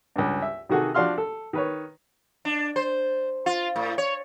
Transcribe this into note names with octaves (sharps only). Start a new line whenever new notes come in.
C#2 G2
E5
C3 D#3 F#4 G#4 A4
F3 D4 F#4 F5 C6 F6
A4
D#3 B4 C#5
D4
C5
F4
A2
C#5